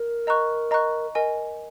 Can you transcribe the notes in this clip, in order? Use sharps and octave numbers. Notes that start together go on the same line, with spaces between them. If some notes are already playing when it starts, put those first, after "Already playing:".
Already playing: A#4
D#5 A#5 C#6 F#6
D#5 A#5 C#6 F#6
A#4 D#5 G#5